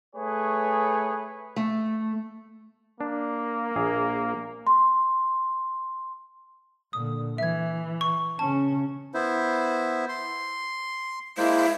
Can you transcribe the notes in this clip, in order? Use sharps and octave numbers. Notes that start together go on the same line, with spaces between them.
A3 G#4 B4 C#5
A3
A#3 D4
A#1 G#4 F5
C6
A#2 D3 D#6
E3 E5 G#6
C#6
C#3 C#4 A5
B3 E4 C5
C6
G#3 A#3 E4 C5